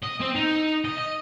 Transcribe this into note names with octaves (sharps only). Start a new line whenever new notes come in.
D#5
C4
D#4
D#5
D#5